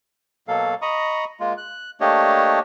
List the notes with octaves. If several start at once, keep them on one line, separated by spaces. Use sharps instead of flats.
B2 F#3 A#3 A4 F5
D#5 A#5 B5 C#6 D#6
G#3 A#3 F4
F#6
A3 A#3 D4 G4 C#5 D#5